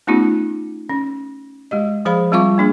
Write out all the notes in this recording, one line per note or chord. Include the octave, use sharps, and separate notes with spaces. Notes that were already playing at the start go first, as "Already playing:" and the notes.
A3 B3 C#4 D#4 F4 G4
C#4
G#3 G4 D#5
F3 G#4 C5 F5 B5
G3 C4 F4 F5 C#6 D6
A#3 D4 G#4